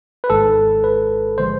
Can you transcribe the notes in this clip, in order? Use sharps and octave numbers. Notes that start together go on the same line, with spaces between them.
B4
G#1 G#2 G#3 A4
B4
D3 F3 G#3 C5